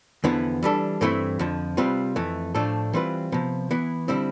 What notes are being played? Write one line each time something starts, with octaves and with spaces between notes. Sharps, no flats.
E2 D3 F3 B3 E4
E3 G3 D4 A4
G2 E3 A3 C4 E4
F2 D3 F3
C3 G3 C4 F4 B4
F2 E3 A3
A2 F3 A3 D4 A4
E3 G3 C4 F4 B4
C3 F3 B3
E3 B3 E4
D3 G3 C4 E4